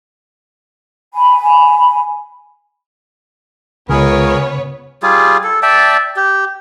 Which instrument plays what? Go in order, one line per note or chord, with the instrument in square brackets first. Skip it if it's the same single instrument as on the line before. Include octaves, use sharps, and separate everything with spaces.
[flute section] G#5 B5
[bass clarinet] C#2 [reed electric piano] C#3 [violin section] B3 B4 C#5 [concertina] G#4 A#4
[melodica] G3 F4 G#4
A4
D5 E5 G5 A5
G4